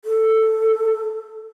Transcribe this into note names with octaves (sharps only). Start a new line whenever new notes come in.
A4